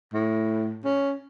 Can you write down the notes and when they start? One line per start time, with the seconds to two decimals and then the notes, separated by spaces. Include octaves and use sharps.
0.13 A2
0.84 C#4